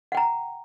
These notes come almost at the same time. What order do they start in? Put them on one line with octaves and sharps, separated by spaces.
F#5 G5 A#5